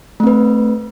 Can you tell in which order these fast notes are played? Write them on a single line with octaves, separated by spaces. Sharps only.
A3 C4 B4